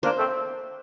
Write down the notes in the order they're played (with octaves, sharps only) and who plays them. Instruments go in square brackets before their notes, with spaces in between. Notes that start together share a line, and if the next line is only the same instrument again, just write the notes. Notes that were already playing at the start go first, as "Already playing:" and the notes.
[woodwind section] A#3 D4 [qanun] C5
[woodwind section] A3 C4